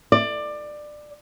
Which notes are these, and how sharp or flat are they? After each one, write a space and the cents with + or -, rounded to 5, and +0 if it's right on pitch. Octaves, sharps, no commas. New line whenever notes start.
D5 +20